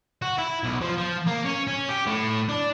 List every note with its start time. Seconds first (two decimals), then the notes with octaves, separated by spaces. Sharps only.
0.22 F#4
0.38 E4
0.63 B1
0.81 F3
0.98 F3
1.27 A#3
1.45 C#4
1.68 C#4
1.89 G4
2.06 A2
2.49 D4